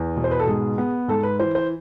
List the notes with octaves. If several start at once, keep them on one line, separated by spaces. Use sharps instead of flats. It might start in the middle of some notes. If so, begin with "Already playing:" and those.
Already playing: E2
B2
C5
B4
A4
G#2 G#4
B3
G#2 A4
B4
E3 C5
C5